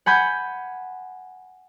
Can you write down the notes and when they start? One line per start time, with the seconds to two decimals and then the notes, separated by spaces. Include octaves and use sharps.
0.06 F#5 G#5 B5 G6